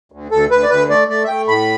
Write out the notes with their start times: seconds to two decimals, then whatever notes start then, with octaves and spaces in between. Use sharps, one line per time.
0.12 D2
0.31 D2 A4
0.51 D2 B4
0.63 D5
0.70 D2 B4
0.89 A3 D5
1.08 A3 D5
1.24 E5
1.28 A3 G5
1.47 A2 B5